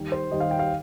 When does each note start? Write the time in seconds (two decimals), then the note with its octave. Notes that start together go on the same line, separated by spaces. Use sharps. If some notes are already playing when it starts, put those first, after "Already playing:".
Already playing: D#2 D#3 G3
0.12 C5
0.31 D#2 D#3 G3 D#5
0.40 F5
0.51 G5
0.59 F5